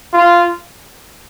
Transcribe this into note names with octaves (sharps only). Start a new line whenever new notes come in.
F4